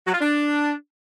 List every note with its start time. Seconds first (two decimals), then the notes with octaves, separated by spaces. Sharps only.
0.05 F#3
0.13 F4
0.21 D4